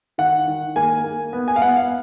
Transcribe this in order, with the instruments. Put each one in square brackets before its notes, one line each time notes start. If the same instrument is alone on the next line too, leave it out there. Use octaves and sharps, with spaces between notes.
[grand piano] D#3 F#5
D#3
A#3 G#5
A#3
B3
G#5
F5
B3 F#5
F5